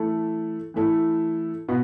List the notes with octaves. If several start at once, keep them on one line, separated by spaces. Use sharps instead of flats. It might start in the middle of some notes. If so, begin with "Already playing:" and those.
Already playing: E3 A3 E4 A4
E3 A3 E4 A4
B2 B3